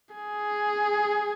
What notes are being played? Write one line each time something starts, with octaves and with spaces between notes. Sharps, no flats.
G#4